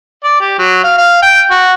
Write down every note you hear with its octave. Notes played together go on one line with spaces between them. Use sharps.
D5
G4
F#3
F5
F5
G5
F#4